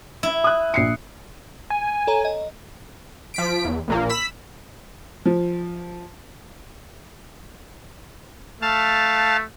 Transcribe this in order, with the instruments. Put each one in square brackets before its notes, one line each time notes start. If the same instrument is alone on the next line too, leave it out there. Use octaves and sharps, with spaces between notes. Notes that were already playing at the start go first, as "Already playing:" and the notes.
[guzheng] E4
[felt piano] D#6 F#6
A#1 C7 C#7
[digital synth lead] G#5
[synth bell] A4 C#5 A#5
D#5
[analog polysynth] F3 B6 D7
E2
A#1 A#2 A#3
B5 E6 B6
[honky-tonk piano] F3
[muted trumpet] A3 [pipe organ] F5 A5